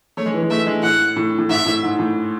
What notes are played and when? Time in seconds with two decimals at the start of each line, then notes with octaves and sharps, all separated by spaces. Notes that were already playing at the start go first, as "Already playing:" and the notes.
0.17 A3 C#5
0.26 G#3
0.34 E3
0.43 G#3
0.50 A3 E5
0.67 G#3
0.83 A2 F#5
1.16 A2
1.38 A2
1.49 G#2 E5
1.66 A2
1.83 G#2
1.99 A2